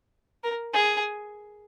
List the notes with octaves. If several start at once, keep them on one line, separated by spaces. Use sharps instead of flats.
A#4
G#4